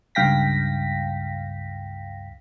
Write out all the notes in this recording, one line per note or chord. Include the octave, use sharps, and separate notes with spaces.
C#2 G2 F5 G5 A#6 B6